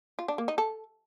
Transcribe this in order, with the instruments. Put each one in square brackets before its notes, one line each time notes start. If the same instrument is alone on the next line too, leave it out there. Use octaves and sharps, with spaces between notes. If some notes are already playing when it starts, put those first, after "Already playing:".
[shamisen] F4
D4
A#3
D#4
A4